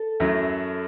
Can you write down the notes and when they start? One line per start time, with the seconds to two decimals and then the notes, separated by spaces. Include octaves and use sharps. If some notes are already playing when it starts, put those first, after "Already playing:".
Already playing: A4
0.20 F#2 F#3 A3 E4